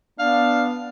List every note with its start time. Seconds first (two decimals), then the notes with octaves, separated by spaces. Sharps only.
0.19 B3 D4 F5